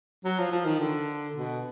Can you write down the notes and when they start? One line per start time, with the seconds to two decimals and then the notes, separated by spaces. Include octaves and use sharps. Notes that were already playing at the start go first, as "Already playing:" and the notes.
0.24 F#3
0.39 F3
0.52 F3
0.65 D#3
0.79 D3
1.34 B2